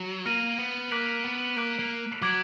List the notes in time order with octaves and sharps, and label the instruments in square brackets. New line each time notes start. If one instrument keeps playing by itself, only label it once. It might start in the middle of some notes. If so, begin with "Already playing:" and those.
Already playing: [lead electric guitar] F#3
[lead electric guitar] A#3 [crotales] F6 A#6 D#7 F#7
[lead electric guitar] B3
[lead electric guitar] A#3 [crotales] D6 F#6 B6 D7 F#7
[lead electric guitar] B3
[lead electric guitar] A#3 [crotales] D6 F#6 B6 D7 F#7
[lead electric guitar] A#3
[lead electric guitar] F#3 [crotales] D6 G#6 D7 F#7